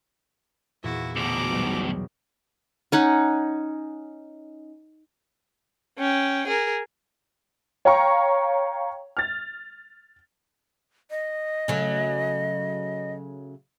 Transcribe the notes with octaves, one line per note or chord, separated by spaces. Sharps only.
E2 A#2 E4 F#4
D2 B2 A#5 D6
B1 G3
C#4 D#4 F#5
C#4 G5
G#4 A#4
C#5 F5 G5 A#5 C#6
F6 A6
D#5
C#3 F#3 A3